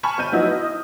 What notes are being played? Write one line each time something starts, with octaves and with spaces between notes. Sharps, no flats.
G#5 A5 B5 C#6 F6
G1 G6 D#7
F3 F#3 B3 D#4 E4 F#4
D#5
D#6